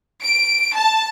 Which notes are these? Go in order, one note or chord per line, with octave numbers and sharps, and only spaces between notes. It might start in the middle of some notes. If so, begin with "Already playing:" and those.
D7
A5